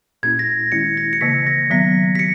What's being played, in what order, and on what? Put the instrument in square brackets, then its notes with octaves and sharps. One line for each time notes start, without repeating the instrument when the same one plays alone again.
[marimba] A#2 A#3 C#4 E4 [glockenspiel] G#6
[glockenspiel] A#6
[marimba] D#3 G#3 C#4 E4 [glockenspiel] C#7
[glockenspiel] A#6
C#7
[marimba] C#3 E3 A#3 [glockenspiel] B6
[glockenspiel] A#6
[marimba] D#3 F#3 B3 [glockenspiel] B6
[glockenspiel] B6
C#7